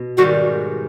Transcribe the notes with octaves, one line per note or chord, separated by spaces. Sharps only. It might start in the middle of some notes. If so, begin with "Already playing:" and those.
Already playing: B2
G#2 D#3 G3 F#4